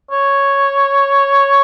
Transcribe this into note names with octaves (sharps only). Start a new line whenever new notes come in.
C#5